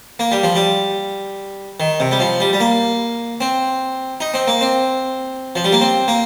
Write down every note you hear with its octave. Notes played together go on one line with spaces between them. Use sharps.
A#3
G3
F3
G3
D#3
C3
G3
F3
G3
G3
A#3
C4
D#4
C4
A#3
C4
F3
G3
A#3
C4
A#3